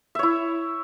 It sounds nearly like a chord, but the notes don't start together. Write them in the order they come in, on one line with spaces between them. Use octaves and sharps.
E5 C#5 E4